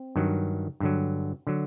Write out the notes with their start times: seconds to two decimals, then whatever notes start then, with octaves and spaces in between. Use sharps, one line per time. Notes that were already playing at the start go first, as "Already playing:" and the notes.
Already playing: C4
0.16 G2 D#3 F#3
0.80 G2 D3 F#3
1.47 D3 F#3